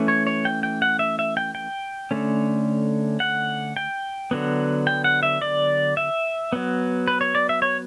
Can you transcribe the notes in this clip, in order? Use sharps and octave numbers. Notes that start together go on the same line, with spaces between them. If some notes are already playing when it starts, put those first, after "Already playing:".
Already playing: E3 A3 C#4
C#5
C#5
G5
G5
F#5
E5
E5
G5
G5
D3 A3 C#4
F#5
G5
D3 F#3 B3
G5
F#5
E5
D5
E5
F#3 B3
B4
C#5
D5
E5
C#5